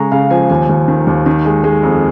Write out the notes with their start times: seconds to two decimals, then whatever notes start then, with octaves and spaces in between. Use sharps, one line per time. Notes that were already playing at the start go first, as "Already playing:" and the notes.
Already playing: C#3 G#3 A#5 C#6
0.12 C#3 F5
0.30 F3 G#5
0.50 D#2 G#5
0.69 D#2
0.88 D#3
1.07 D#2
1.26 D#3
1.45 G#3
1.64 G#3
1.83 F2